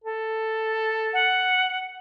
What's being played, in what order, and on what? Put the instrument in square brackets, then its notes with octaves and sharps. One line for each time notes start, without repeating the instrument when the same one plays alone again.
[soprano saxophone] A4
[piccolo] F#5